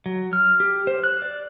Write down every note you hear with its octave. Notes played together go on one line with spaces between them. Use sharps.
F#3
F6
G4
C5
F#6
D5